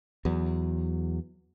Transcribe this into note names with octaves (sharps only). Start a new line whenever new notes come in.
E2 F#3